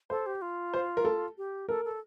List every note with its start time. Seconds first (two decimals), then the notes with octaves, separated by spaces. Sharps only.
0.10 A4 C5
0.26 G4
0.42 F4
0.74 C5
0.97 A#4
1.05 A4
1.38 G4
1.69 A4 A#4
1.85 A4